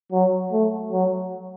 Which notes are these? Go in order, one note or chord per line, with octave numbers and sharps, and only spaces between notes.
F#3
A3
F#3